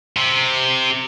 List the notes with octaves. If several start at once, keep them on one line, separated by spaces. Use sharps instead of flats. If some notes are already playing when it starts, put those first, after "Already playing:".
C3